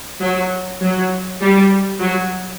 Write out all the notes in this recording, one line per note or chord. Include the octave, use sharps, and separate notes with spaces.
F#3
F#3
G3
F#3